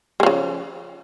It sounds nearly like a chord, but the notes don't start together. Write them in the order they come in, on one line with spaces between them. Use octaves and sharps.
G#3 F3 C#3